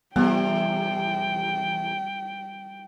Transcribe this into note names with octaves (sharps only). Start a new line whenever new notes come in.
E2 C3 G3 B3 G5